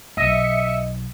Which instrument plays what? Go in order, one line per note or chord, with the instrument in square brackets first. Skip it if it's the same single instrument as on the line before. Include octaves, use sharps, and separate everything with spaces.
[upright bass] B1 [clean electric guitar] D#5 [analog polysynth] E5 C#7